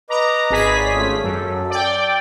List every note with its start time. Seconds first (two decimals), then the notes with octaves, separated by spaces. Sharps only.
0.10 B4 D#5 A#5 D6
0.50 G#1 G#4 B6
0.76 C#5 D5
0.95 A3 C#4 F4
1.24 F#2 A4
1.70 D5 G5